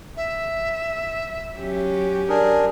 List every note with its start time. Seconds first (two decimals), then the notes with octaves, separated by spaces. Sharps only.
0.17 E5
1.57 F#3 C#4 G4
2.29 D4 G#4 A#4